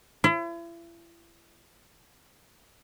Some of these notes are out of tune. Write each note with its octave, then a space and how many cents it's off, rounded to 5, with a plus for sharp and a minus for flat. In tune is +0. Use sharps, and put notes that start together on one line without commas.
E4 +40